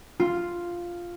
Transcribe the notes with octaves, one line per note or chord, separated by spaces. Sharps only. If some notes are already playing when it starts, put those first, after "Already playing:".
F4